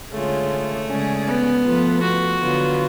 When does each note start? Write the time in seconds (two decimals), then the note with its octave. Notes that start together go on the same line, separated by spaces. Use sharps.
0.12 D3 G#3 A3 C#4 F4
0.88 C#3 G#3 C#4 G#4 D5
1.27 B3
1.65 F3 A3 F4 B4
2.02 F#4
2.41 D3 F#3 B3 F4